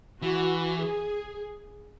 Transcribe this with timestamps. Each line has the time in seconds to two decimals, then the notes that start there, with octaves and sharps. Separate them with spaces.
0.22 E3 F#4
0.79 G#4